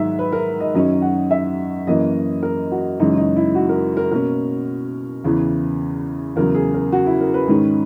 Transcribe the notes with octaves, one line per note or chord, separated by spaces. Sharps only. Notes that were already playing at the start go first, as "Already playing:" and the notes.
Already playing: G#2 D#3 F#3 E5
B4
A#4
D#5
F#2 D#3 F#3 C#4 D#5
F#5
E5
F#2 E3 A#3 C#4 D#5
A#4
F#4
F#2 C#3 E3 G#3 C#4 D#4
D#4
E4
F#4
A#4
A#4
B2 A#3 C#4 A#4
E2 C#3 E3
E2 C#3 F#3 A#4
G#4
A#4
F#4
E4
A#4
B4
G#2 D#3 G#3 C#4